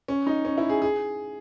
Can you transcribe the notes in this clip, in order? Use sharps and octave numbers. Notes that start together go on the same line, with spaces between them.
C#4
D#4
C#4
E4
G#4
G#4